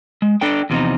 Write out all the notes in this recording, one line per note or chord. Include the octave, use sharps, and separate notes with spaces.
G#3
D4 A4 G5
E2 C3 D#3 F3 D#4